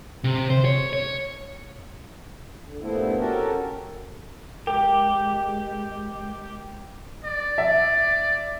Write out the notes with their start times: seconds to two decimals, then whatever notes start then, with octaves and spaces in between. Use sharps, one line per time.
0.24 C3
0.50 C5
0.65 C#5
0.93 C#5
2.65 D3
2.80 G2 A#2 A3 B3 C4 E4
3.18 C#4 F#4 G4 A4 A#4
4.67 G#3 G4 A#4 G5
7.25 D5
7.58 E5